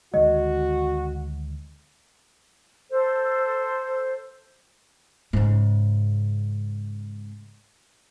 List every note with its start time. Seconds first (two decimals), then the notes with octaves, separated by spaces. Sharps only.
0.14 D2 D#3 G#3 F#4 D#5
2.90 A4 C5
5.33 G#2 C#3